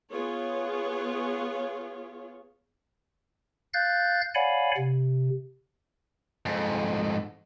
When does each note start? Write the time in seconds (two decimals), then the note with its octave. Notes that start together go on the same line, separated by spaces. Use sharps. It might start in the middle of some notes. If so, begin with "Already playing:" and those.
0.11 B3 F4 G#4 C#5
3.74 F5 F#6 G6 A6
4.35 C#5 D5 F5 F#5 G#5 B5
4.77 C3
6.46 F2 G#2